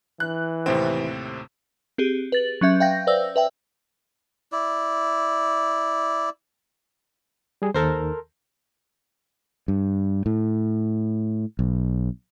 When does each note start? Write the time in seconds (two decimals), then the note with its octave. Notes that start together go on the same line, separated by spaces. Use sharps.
0.20 E3 F#6
0.66 D#2 A2 C3 C4
1.98 C4 G4 G#4
2.32 B4 A6 F#7
2.61 F#3 C#4 E5 G6
2.80 E5 F5 G5 G6 A#6
3.07 B4 C5 D5 E6
3.36 B4 E5 G5
4.52 E4 D5
7.62 G3 G#4
7.74 D#2 D#3 A4 A#4 C5
9.68 G2
10.26 A2
11.59 B1